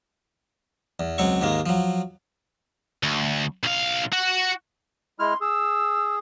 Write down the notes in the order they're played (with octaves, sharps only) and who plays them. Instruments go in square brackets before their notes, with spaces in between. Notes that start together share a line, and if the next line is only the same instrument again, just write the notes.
[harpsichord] E2
C#2 F#3 C4 C#6
D#2 G#2 G#3 A#3
F3 F#3
[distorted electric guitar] D2
B1 F5
F#4
[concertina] G#3 E4 F6 [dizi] C6
[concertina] G#4 [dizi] E6